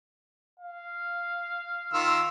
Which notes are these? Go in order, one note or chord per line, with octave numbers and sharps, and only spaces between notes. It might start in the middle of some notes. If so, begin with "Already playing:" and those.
F5
D#3 F4 E6